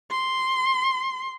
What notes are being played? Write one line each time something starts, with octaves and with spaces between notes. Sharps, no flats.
C6